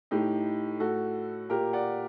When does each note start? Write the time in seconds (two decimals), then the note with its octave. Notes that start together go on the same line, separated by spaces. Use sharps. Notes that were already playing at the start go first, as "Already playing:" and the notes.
0.11 A2 D#4 G4
0.80 A2 F#4 A4
1.49 A#2 G4 A#4
1.73 D5 F#5